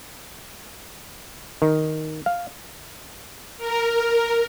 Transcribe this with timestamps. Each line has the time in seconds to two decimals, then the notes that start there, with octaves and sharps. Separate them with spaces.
1.62 D#3
2.26 F5
3.57 A#4